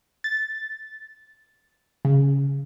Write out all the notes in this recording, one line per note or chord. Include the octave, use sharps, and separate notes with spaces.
A6
C#3